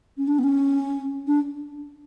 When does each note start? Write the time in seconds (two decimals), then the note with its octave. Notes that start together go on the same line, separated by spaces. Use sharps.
0.17 C#4
0.27 D4
0.39 B3
0.44 C#4
1.27 D4